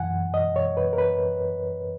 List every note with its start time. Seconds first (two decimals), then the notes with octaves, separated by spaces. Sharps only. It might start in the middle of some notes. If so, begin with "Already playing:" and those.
Already playing: F#2 E3 F#5 G#5
0.34 D#5
0.56 C#5
0.77 B4
0.93 A#4
0.98 B4